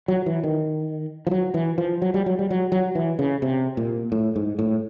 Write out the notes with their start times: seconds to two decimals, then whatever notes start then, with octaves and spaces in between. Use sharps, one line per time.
0.08 F#3
0.26 E3
0.44 D#3
1.27 F3
1.31 F#3
1.54 E3
1.78 F3
2.02 F#3
2.14 G3
2.26 F#3
2.39 G3
2.50 F#3
2.72 F#3
2.95 E3
3.19 C#3
3.42 C3
3.77 A#2
4.12 A2
4.36 G#2
4.59 A2